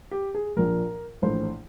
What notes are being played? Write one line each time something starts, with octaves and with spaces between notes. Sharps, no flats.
G4
G#4
A#1 A#2 F3 A#4
A#1 A2 E3 C5